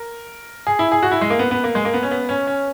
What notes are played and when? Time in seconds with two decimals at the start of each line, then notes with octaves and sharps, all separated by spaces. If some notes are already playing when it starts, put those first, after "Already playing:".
Already playing: A#4
0.67 G#4
0.79 E4
0.92 G#4
1.03 F#4
1.12 E4
1.21 G#3
1.30 A#3
1.39 B3
1.51 B3
1.64 A#3
1.75 G#3
1.85 A#3
1.94 B3
2.03 C#4
2.11 B3
2.29 C#4
2.47 C#4